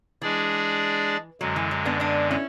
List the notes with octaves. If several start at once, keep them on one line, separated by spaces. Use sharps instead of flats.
E3 G#3 D4 G#4 D5
F#2 D3 F#3 G#3
E3
F#3
B3 D4
B3 D4
C#4 E4